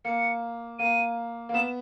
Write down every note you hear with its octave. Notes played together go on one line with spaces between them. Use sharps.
A#3 C#7
A#3 D#7
A#3
B3 E7